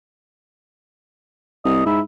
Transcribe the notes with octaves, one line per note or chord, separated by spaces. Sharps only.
C2 D#5
G#2 E4